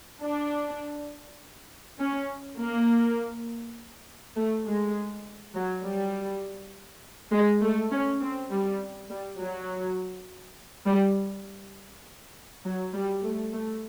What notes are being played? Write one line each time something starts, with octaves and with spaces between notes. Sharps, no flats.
D4
C#4
A#3
A3
G#3
F#3
G3
G#3
A3
C#4
C4
G3
G3
F#3
G3
F#3
G3
A3
A3